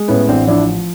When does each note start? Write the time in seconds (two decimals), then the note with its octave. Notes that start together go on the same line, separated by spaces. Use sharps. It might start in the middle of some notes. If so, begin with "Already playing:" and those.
Already playing: G#3
0.08 A2 B3 C#4
0.28 A1 C4 D4
0.47 F3 D4 E4